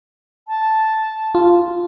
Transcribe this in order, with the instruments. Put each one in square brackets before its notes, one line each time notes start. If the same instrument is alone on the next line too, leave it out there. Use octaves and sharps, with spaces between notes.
[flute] A5
[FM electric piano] F4